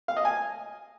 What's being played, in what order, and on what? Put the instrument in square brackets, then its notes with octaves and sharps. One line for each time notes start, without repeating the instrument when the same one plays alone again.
[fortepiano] F5
D#5
G#5